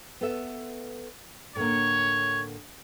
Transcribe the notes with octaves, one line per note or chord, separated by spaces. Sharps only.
B3 A4 E5
A2 D3 A#3 C#5